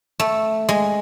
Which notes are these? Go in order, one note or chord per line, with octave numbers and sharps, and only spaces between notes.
A3
G#3